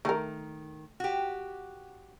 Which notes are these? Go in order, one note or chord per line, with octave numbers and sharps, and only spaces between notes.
D#3 A3 A#4
F#4 G4